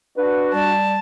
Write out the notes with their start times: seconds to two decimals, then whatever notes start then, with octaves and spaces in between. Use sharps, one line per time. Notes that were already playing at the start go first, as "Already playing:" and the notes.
0.17 D4 F#4 B4
0.54 G3 A5